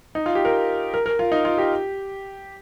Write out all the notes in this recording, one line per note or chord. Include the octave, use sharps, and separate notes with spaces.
D#4
F4
G4
A#4
A#4
A#4
F4
D#4
F4
G4